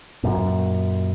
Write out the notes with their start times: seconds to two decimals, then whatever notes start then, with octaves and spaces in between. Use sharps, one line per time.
0.23 F#2 A#2